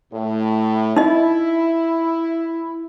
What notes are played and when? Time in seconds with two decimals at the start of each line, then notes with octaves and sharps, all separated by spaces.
0.13 A2
0.96 D#4 E4 D#5